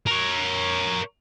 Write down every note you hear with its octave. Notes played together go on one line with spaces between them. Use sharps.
A#4 C#5